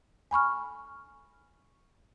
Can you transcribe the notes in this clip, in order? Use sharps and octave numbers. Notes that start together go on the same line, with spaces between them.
G#5 B5 C#6 F6